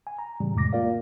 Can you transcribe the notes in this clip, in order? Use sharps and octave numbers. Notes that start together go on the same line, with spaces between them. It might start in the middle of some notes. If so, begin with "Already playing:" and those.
G#5
A#5
A2 C#3 E3 G3
F2 A2 C3 G#3 D6 A#6
A#3 F4 A#4 D5 F5